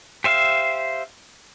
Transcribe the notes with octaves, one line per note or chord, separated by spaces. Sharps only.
G4 C5 E5 F5